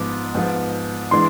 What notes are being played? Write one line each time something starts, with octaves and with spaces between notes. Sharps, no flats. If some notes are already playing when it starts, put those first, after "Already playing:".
Already playing: G#2 F3 B3 D6
G#2 F3 B3
E3 G#3 D4 C6